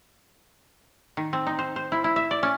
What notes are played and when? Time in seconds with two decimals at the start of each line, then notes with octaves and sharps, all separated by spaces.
1.17 D#3
1.33 C4
1.47 D#4
1.59 C5
1.76 C5
1.92 E4
2.04 E4
2.16 E5
2.31 D5
2.43 C#4